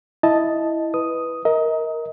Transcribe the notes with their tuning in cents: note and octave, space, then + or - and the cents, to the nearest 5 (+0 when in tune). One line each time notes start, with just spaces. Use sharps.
E4 +0 D#5 +0 A5 +0
B4 +0 D#6 +0
A#4 +0 D#5 +30